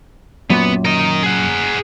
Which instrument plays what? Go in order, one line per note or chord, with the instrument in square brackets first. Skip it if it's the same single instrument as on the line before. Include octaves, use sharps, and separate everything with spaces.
[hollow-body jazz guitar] F#2 A#2 [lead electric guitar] B3
[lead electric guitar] A#4 D#5
G#4 F#5